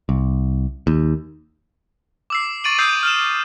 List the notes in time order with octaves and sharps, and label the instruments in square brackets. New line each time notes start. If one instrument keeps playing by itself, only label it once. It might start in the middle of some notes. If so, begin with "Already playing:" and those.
[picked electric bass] C2
D#2
[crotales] D6 E6 C7
C#6 A6 D7 D#7 F#7
D#6 E6 G6 C7
F6 E7